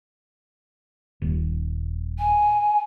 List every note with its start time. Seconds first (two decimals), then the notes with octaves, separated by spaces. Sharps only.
1.22 D#1
2.19 G#5